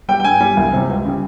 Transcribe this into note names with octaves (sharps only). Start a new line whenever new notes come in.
G3 G5
G5
G2 G#5
G3
C2
C3 G3
C#2
C#3 G3